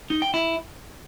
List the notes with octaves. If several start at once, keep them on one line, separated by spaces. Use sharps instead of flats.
D#4
G5
E4